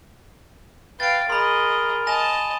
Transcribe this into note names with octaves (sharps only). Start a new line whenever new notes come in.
B4 F5 G5 A6 D7
G#4 A#4 D#5 B5 C6
D#5 G#5 A5 A#6 F7